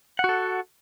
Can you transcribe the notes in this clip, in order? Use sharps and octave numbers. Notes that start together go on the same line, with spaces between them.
F#4 A4 F#5